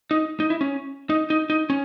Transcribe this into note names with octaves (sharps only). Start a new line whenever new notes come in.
D#4
D#4
E4
C#4
D#4
D#4
D#4
C#4